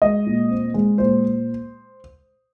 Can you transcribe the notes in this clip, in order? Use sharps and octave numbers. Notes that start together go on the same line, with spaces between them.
G#3 D#5
A#2
C4
G#3
A#2 C5